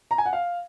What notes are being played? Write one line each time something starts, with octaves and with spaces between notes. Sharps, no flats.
A#5
G#5
F#5
F5